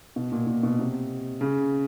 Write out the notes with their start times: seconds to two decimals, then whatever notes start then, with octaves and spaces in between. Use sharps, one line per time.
0.16 B2
0.32 A#2
0.47 A#2
0.63 B2
0.79 C3
1.41 C#3